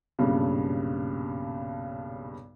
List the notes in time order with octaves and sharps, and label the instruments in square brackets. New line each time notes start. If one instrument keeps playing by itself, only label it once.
[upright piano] B1 G2 A#2 C#3